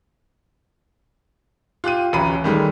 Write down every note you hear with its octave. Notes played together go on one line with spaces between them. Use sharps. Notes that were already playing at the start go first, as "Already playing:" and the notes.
F4 G4 F#6 D#7
D1 A1 C#4 A#5 B5 D#7
D#3 G3 G#3 A4